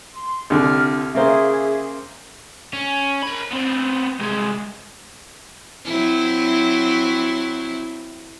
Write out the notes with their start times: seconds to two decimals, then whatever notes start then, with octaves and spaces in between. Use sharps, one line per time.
0.13 C6
0.50 C2 D3 F6
1.15 C#3 A#3 G#4 C5 E5
2.73 C#4
3.23 A#4 B5
3.51 B3 C4
4.19 C2 G#3
5.85 F#3 C4 E4